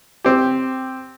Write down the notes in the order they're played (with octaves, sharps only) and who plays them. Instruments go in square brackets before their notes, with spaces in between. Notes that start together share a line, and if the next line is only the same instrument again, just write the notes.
[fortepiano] C4 G4